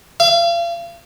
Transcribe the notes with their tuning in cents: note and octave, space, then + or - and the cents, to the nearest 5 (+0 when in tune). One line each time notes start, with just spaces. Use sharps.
F5 -40